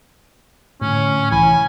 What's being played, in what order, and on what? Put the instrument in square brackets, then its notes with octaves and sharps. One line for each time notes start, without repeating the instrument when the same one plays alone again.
[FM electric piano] A2 D3 [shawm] C#4
[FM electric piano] C2 E3 B5 [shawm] G#5